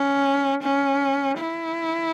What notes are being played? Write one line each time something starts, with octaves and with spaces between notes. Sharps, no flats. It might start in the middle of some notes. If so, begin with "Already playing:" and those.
Already playing: C#4
C#4
E4